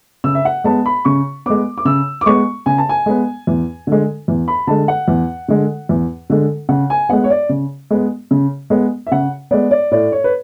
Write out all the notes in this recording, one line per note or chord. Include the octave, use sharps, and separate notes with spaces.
C#3 E6
E5
F#5
G#3 B3 A5
B5
C#3 C#6
G#3 B3 D6
D6
C#3 E6
D6
G#3 B3 C#6
C#3 G#5
A5
G#5
G#3 B3
E2
D3 G#3
E2
B5
D3 G#3 A5
F#5
E2
D3 G#3
E2
D3 G#3
C#3 F#5
G#5
G#3 B3 F#5
C#5
D5
C#3
G#3 B3
C#3
G#3 B3
E5
C#3 F#5
G#3 B3 D5
D5
A2 D5
C#5
B4